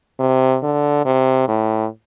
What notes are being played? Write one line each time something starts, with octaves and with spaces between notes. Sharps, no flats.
C3
D3
C3
A2